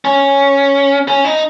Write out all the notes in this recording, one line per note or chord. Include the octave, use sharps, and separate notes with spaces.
C#4
C#4
D#4